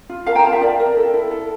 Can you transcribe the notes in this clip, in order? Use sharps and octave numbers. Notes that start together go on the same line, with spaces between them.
F4
A#4 F5 A5
G5 A#5
F4 F5 A5
E5 G5
A#4 D5
A#4
A4
E4
A4